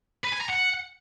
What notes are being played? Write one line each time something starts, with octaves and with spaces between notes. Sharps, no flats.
B4
G#5
A#5
F#5